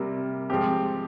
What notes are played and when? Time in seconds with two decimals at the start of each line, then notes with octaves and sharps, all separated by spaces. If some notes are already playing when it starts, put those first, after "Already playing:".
Already playing: C3 G3 A#3
0.50 F3 G#3 C4 G4